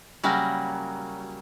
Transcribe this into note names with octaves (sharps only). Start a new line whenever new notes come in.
C#3 F#3 G3 A#3